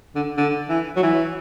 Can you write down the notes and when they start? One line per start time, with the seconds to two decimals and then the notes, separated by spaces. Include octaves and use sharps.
0.15 D3
0.37 D3
0.69 E3
0.96 F#3
1.03 E3